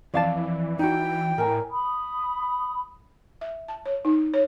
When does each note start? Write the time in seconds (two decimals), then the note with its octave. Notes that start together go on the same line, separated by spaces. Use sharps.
0.14 F2 E3 D5 F5 A5
0.79 D#4 F#4 G5
1.38 A2 A#4 G#5
1.70 B5 D#6
3.41 E5
3.68 A5
3.86 C#5
4.05 D#4
4.34 C#5